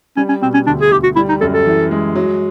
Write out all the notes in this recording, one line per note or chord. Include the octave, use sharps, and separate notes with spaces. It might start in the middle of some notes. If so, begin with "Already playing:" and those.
G3 C#4
C#4
B2 C4
C#4
D2 D4
G#4
D2 G4
F#4
G3 E4
D#4
F#2 A4
A4
E3
G#3
F#3